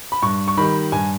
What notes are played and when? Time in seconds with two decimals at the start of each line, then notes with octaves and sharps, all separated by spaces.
0.12 B5
0.22 G2 C#6
0.48 C#6
0.57 D#3 G3 B5
0.92 G2 G#5